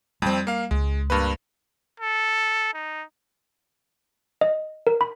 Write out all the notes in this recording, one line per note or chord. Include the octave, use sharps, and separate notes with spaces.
F2 G3 G#3 C4
A#3 F5
C#2 G#3
G2 A#3 B4
A4
D#4
D#5
A#4
B5